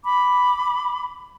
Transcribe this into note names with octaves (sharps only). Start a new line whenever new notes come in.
B5 D6